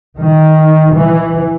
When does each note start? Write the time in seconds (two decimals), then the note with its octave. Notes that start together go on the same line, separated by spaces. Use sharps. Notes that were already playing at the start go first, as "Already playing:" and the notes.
0.19 D#3
0.96 E3